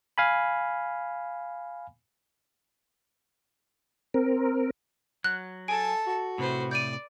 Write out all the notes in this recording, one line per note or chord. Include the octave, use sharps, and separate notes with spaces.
F5 G#5 B5
C4 A#4
F#3 F#6
A4 G#5 A5 D7
F#4
A2 C3 B4 C5
D5 G6 D#7